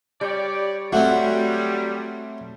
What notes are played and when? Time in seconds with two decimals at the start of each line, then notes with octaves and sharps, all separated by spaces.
0.21 G3 G4 C#5 D5
0.93 F#3 G3 A3 C4 F#4